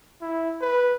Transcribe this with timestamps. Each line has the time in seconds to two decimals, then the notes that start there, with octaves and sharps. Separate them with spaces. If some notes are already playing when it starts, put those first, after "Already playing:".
0.22 E4
0.61 B4